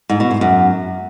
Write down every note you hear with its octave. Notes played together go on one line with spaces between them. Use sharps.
G#2
B2
G#2
F#2